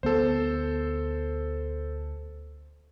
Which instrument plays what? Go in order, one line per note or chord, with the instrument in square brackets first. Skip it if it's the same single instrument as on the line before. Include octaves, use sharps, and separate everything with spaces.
[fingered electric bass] D2 B3 [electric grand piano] A4 C5